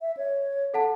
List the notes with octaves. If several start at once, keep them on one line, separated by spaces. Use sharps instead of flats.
E5
C#5
A4 F#5 A5